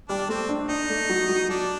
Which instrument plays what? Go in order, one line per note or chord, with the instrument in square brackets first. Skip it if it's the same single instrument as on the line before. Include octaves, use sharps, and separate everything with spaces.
[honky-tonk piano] G3 [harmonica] D4
[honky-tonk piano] A3 [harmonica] C4
[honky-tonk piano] D4
[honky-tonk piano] D4 [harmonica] D#4
[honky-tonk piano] A3
F#3
F#3
[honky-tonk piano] F#3 [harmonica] D4